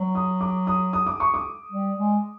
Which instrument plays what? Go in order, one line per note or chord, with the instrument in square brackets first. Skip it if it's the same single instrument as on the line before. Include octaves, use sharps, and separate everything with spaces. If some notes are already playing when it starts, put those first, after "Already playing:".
Already playing: [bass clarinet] F#3
[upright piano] D#6
D6
D#6
D#6
D6
C#6
D6
[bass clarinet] G3
G#3